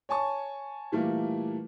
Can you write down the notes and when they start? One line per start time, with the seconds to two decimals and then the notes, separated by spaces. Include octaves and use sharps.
0.09 C#5 G#5 A5 C#6
0.92 A#2 E3 G3 A3 A#3